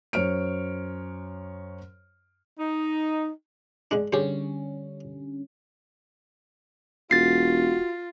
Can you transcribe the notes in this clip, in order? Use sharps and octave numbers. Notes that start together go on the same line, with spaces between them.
F#2 C5 C#5 F6 D7
D#4
D3 G#3 D4
D3 G3 C#4 G4 G#4 C5
E1 F4 F#4 A6 C7